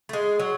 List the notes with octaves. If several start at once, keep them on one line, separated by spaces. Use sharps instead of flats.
A3
G#3
F#3